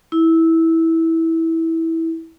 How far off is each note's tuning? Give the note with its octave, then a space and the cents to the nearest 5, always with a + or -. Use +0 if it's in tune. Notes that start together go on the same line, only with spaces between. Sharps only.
E4 -15